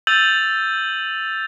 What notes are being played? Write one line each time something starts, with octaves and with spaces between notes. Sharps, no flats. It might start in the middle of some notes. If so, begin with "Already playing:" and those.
E6 G6 A6 D#7 F7 F#7